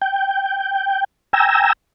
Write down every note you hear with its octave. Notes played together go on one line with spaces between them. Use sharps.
G5
G5 G#5 A#5 E6